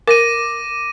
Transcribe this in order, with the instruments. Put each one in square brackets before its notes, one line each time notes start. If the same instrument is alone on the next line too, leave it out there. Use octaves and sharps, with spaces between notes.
[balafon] A#4 [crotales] D6 A#6 D#7